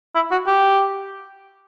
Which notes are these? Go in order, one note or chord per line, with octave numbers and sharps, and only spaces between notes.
E4
F#4
G4